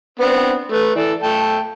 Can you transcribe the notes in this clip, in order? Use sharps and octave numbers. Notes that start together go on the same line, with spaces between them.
B3 C4 D4
A3 B4
E3 A4 D5
A3 G5 A5